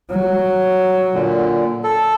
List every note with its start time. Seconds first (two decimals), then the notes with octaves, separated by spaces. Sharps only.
0.11 F#3
1.14 A#2 D3
1.84 A4